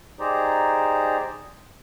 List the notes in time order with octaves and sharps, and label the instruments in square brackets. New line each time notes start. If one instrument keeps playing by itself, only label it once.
[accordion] D#4 G4 G#4 C5 D5 A#5